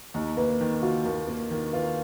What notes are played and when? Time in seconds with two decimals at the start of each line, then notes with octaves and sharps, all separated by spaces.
0.14 D#2 D#4
0.37 A#3 B4
0.61 D#3
0.82 F4 F#4
1.05 D#2 A#4
1.28 A#3 A#4
1.50 D#3 A#4
1.73 F4 B4